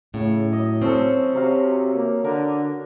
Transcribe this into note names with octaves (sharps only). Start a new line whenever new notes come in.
A2 C#3
F#3 D#5
C4 C#4 A4
C3 F#3 F5
A#3
D3 A#4